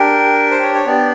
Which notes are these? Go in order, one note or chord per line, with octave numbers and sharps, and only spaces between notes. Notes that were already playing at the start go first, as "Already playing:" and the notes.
Already playing: D4 G4 A#4
C5
C#5
C#5
B3 D4 G4 D5